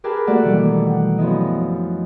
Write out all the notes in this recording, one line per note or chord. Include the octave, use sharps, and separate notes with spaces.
G4 G#4 A#4 B4 A5
A3 A#3 F#4 A4 D5 F#5
B2 D#3 E3 G3
F#5 G5
F#2 F3 B3 E4 D#5